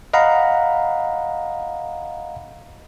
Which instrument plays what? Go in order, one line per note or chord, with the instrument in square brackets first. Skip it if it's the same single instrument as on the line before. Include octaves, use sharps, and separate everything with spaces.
[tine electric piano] D#5 F5 F#5 A#5 B5